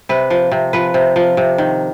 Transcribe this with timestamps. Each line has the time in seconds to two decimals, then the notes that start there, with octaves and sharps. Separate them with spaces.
0.09 C3 B4
0.30 F3
0.52 C3
0.73 F3 B4
0.94 C3
1.16 F3
1.37 C3
1.58 D#3